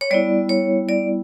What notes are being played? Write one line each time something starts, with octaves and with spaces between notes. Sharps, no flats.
C#5
G3 B3 E4 D5
C#5
D5